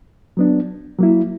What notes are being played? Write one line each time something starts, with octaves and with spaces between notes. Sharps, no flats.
F#3 B3 D4
F#3 A#3 E4